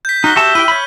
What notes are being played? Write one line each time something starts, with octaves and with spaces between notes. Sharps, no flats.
G6 B6
D#4 F#4 F6 B6 G7
F#4 G4 E5 A5
E4 G4 G5 D#7
C#5 B5